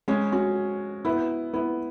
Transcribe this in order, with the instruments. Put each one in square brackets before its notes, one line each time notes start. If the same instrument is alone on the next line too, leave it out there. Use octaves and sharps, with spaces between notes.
[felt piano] G#3 C#4
C#4 F#4
B3 E4
B3 E4